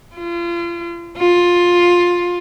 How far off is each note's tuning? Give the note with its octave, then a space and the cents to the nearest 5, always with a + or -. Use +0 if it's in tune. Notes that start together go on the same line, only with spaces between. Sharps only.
F4 -35
F4 +15